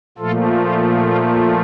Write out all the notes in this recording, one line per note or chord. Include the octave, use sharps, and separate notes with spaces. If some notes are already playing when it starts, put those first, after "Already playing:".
A#2 F3 A3 F4 A4
F4
F4